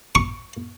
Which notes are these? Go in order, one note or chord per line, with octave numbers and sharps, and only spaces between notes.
C#6